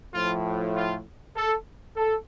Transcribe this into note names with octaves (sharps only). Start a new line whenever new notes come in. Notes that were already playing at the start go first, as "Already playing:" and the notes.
A2 F3 F4
F4
A4
A4